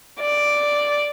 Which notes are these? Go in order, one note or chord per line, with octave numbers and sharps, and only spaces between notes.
D5